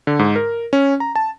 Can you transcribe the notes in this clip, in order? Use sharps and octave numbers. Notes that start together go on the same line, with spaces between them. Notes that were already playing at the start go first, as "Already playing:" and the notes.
D3
G#2
A#4
C#4
A#5
A5